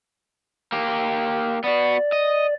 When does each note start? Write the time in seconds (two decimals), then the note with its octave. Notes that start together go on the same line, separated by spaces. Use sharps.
0.72 A#3 G4
1.64 B3 F#4 D5
2.12 D#5